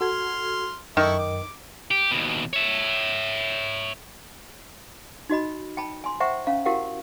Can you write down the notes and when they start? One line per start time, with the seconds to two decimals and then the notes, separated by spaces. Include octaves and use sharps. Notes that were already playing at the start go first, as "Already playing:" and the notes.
0.01 F#4 A4 C6 F6 G#6
0.97 F#2 D#3 E4 A4 C#6
1.19 D6
1.91 G4
2.11 D#2 B2
2.53 C#5 E5
5.29 D#4 F#4 D#5 B5
5.77 G5 A5 B5
6.04 G#5 C6
6.20 C5 E5 F#5 G5 A#5 C#6
6.47 C#4 F5 A#5
6.66 E4 F#4 G4 A#4 F5 F#5